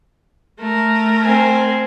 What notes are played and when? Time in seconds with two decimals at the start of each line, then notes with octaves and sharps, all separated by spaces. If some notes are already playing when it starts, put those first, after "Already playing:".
0.59 A3 A#4
1.22 C4 G#5